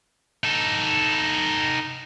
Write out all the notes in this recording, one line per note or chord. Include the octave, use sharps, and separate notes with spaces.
D#4 A4